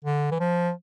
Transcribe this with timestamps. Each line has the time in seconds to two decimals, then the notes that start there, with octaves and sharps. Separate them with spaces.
0.05 D3
0.31 E3
0.39 F3